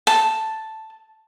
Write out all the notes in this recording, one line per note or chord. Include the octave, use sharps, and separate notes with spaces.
A5